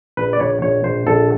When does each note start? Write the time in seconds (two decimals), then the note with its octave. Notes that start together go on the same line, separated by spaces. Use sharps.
0.17 A#1 B4
0.33 D5
0.40 A#1 C#5
0.62 A#1 C#5
0.84 A#1 C5
1.06 A#1 A4